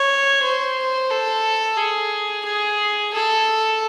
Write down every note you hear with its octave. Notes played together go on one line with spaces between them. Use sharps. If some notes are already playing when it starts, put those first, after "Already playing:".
Already playing: C#5
C5
A4
G#4
G#4
A4